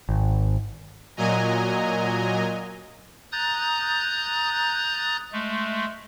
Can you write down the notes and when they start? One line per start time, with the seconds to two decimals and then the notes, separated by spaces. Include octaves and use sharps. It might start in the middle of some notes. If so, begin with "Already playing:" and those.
0.09 G#1
1.17 A#2 F#3 D#5 G#5 A#5
3.32 A#5 D#6 F#6 G6 A6
5.33 G#3 A3